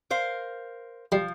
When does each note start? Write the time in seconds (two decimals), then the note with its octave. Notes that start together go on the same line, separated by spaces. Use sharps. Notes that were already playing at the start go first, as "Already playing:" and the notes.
0.10 A#4 C5 F5
1.12 F3 G3